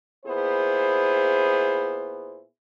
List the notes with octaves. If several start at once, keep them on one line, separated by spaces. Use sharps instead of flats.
A#2 B3 E4 G#4 C5